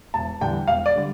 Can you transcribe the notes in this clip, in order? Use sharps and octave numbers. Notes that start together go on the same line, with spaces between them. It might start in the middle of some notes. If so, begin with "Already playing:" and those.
E1 A5
E2 D3 G3 D4 G5
E1 F5
D5
D3 G3